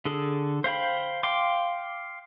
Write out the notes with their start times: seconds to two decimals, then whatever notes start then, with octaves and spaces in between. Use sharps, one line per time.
0.05 D3 G#4 A4
0.64 C5 F5 G5 B5
1.23 F5 G5 C6 D6